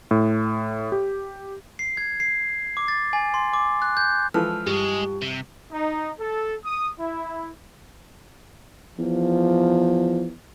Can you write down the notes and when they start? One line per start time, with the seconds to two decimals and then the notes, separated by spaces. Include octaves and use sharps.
0.11 A2
0.92 G4
1.79 C7
1.97 G#6
2.20 C7
2.77 D6
2.88 A6
3.13 G#5
3.34 C6
3.53 D6
3.82 F#6
3.97 G6
4.34 E3 F3 G#3 A4 F6
4.67 G2 G3 G#3 G4 G#4
5.22 C3
5.71 D#4
6.19 A4
6.65 D#6
6.99 E4
8.98 E2 F3